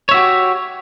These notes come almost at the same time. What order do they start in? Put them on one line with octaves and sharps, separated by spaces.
C#5 E5 F#4 G4